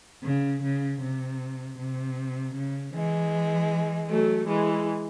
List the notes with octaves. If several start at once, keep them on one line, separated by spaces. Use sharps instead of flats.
C#3
C#3
C3
C3
C#3
E3 G#3
F#3 A3
E3 G#3